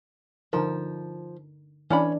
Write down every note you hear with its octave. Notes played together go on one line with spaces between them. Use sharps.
D3 F3 D#4 A#4
E3 C#4 D4 B5